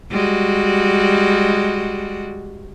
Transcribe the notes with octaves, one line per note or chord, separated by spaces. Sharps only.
G3 G#3 F#4